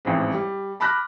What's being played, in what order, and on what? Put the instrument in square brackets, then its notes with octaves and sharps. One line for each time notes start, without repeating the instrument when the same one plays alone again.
[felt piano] A1 F2 G#2
G3
A5 B5 D6 F6 F#6 A#6